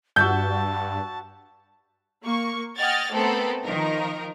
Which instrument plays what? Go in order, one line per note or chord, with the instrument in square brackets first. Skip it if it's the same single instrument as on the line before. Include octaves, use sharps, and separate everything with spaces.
[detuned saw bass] G2 [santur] F#4 E5 F#5 [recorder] A5 [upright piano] G6
[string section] A#3 C#6
D#5 F#5 G5 F6 G#6 A6
A3 B3 C4 A4 A#4
D#3 F3 D#4 A#4